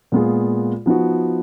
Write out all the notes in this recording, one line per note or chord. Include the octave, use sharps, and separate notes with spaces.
A#2 G#3 B3 F4 G#4
F3 B3 D#4 F#4